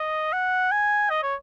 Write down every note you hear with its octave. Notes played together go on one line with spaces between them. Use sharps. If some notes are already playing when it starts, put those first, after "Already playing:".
Already playing: D#5
F#5
G#5
D#5
C#5